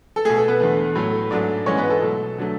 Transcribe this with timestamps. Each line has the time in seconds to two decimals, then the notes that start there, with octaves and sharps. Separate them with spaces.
0.16 A4
0.25 B2 A3 G#4
0.37 A4
0.48 B3 B4
0.60 E2 D3 A3
0.95 A2 F#3 A3
1.31 G#2 F#3 A3 D4 D5
1.66 G#2 E3 G#3 C#4 C#5
1.78 B3 B4
1.90 A4
2.01 B2 F#3 A3
2.38 D3 F#3 A3